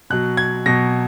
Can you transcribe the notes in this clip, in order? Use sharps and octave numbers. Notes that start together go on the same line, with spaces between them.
B2 F#3 F#6
G#6
B2 F#3 A#6